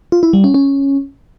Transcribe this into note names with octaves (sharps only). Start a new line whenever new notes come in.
F4
E4
G3
C#4
C#4